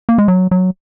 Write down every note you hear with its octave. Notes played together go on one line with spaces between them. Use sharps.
A#3
G#3
F#3
F#3